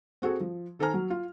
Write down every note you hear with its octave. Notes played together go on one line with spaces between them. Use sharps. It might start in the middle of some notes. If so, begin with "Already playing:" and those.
C4 F#4 G#4 A4
F3
D#3 A4 C5 G#5 A#5 F6
F#3
F4